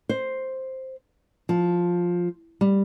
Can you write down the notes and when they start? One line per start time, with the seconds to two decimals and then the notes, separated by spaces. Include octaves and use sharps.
0.09 C5
1.49 F3
2.61 G3